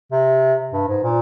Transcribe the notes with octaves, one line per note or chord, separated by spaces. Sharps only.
C3
G2
G#2
A#2